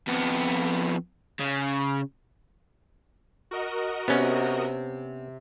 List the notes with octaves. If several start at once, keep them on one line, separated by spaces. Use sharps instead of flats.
F2 B3
C#3
F#4 A#4 D#5
C3 B3 C#4